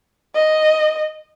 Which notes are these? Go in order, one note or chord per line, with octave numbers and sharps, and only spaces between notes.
D#5